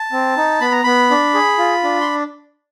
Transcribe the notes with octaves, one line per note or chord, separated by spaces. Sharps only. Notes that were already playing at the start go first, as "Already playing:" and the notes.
Already playing: A5
C4
D#4
B3 B5
A#5
B3 B5
D4
G#4
F4
D4
C6